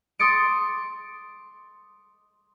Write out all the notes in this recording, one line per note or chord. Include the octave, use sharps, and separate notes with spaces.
C6 D6 D#6 A6 C#7 D7